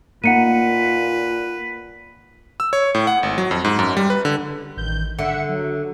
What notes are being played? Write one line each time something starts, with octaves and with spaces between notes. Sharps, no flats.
A#2 A#3 D#4 B4 F#5 C#7 D#7
E6
C#5
A2
F#5
G#1
F#3
F2
G#2
F#2
G3
B4
D3
A1 D#3 G6
D3 E5 F#5 C#7
F#3